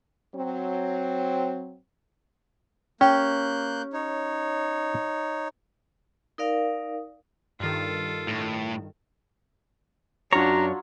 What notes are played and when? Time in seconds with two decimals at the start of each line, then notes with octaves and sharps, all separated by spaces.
0.34 F#3 C4
3.01 A#3 C#4 G4 F#6 G6
3.93 D#4 C#5
6.38 D#4 A#4 D5 F5
7.60 G2 D#3 F4 A4
8.28 A2
10.33 F#2 F#3 D4 F4 C#5 F#5 A#5